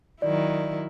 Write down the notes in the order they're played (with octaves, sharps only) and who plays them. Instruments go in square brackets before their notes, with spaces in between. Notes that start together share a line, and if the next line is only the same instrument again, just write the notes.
[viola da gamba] D#3 F#3 E4 [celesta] D5